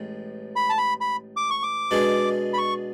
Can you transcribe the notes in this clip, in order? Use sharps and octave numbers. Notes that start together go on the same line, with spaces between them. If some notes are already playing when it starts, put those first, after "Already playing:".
Already playing: A1 A2 G#3
B5
A5
B5
B5
D6
C#6
D6
B2 G#3 B3 D4 G#4
B5
C#6